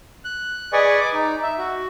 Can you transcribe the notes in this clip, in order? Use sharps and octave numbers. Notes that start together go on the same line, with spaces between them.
F#6
G#4 B4 D5 D#5 G#5 C#6
D6
D#4
E5
F#4